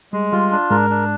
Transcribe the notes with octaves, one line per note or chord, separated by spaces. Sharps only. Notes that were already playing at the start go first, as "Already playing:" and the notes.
G3 G#3
G3 F4
D4
G#2 G#3 A#4
D4